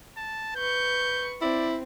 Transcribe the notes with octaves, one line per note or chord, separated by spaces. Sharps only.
A5
B4 C#6 G6
C4 E4 D5